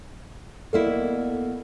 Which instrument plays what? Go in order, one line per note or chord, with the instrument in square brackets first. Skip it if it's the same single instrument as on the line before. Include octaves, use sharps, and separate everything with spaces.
[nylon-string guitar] B2 A#3 E4 [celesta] A4 D5